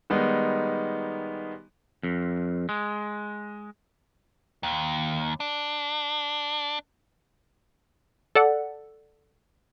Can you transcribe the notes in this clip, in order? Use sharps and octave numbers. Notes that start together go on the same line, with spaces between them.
D#3 G3 G#3 B3 D#4
F2
G#3
D#2
D4
A4 D5 F#5